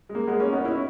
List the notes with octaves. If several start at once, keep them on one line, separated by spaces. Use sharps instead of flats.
G#3
A#3
G#3 B3
A#3 C#4
B3 D#4
C#4 E4